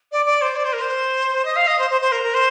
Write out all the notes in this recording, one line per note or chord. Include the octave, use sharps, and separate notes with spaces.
D5
D5
C5
D5
C5
A#4
C5
D#5
F5
D#5
C5
C5
C5
A#4
A#4
C5